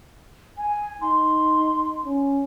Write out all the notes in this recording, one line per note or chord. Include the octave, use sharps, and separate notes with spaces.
G#5
D#4 C6
C#4